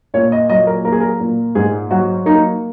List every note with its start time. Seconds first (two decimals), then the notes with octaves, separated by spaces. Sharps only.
0.14 A#2 C#5
0.32 D#5
0.49 F#3 D#5
0.67 A#4
0.85 A#3 A#4
0.92 G#4
1.00 A#4
1.20 A#2
1.55 G#2 G#4
1.91 F#3 F#4
2.26 A#3 D#4